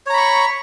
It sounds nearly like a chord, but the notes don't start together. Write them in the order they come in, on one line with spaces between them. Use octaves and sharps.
C#5 A#5 B5 C#6